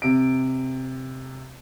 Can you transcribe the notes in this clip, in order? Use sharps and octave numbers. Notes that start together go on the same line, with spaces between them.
C3 D7